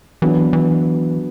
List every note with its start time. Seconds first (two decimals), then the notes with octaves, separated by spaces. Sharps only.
0.22 E3 F#3 B3 D4
0.53 E3